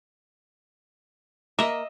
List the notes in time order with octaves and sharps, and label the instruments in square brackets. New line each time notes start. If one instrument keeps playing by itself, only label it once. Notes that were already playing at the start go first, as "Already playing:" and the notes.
[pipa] A#3 [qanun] D#5 E5